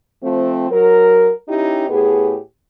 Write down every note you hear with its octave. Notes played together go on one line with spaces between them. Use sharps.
F3 A3 C4
F#3 A#4
C#4 D#4 E4 G4
A2 B3 G4 G#4